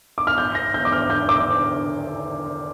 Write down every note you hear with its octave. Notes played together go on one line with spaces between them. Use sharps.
D6
F6
G6
A#6
G6
D6
F6
G6
D6